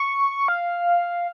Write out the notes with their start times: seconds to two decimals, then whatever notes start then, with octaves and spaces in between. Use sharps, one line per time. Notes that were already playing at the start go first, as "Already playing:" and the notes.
Already playing: C#6
0.48 F5